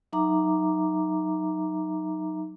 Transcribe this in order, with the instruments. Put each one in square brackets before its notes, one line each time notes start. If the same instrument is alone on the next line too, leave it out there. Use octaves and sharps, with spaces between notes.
[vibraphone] F#3 D#4 E5 A#5 D6